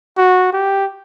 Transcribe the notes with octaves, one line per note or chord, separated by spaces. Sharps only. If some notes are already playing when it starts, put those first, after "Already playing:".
F#4
G4